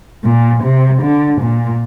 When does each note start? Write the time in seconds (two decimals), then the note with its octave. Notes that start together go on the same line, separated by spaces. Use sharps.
0.23 A#2
0.63 C3
1.02 D3
1.40 A#2